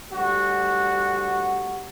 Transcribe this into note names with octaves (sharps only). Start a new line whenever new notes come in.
D2 G3 F#4